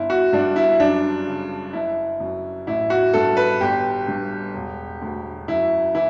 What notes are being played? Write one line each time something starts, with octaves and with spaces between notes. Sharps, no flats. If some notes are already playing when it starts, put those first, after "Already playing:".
Already playing: G1 E4
F#4
G2 D4
E4
F#2 D4
C#3
F#1 E4
F#2
A1 E4
F#4
G2 A4
B4
G1 G4
G2
E1
D2
F#2 E4
E3 E4